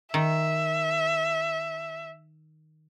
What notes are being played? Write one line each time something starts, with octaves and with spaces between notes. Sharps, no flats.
D#3 E5